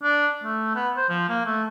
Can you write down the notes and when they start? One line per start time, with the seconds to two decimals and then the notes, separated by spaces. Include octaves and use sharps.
0.03 D4
0.43 A3
0.75 B3
0.97 C5
1.09 F3
1.29 A#3
1.46 A3